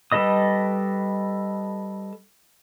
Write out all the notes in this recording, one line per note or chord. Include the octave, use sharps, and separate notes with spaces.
G3 A4 B4 D#5 D#6